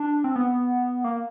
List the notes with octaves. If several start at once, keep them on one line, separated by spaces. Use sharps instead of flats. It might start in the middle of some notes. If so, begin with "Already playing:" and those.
Already playing: D4
C4
B3
A#3